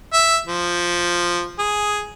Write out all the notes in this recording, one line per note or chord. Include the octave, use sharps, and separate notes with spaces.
E5
F3
G#4